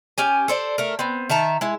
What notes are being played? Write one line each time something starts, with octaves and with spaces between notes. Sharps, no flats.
C#4 G4 G#5
A4 C5 D5
A3 A#4
B3 C4
D#3 E5 A5 A#5
G#3 E4